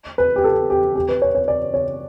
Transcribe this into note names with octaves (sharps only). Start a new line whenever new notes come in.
B4
G4
A4
G4
G4
B4
C#5
C#5
D5
C#5